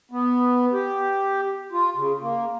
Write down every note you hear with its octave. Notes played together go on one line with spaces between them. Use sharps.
B3
G4
F4
C#3
A#3